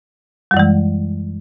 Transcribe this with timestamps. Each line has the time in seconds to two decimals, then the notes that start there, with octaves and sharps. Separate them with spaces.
0.51 G3
0.54 F#2
0.57 E3
0.59 G#3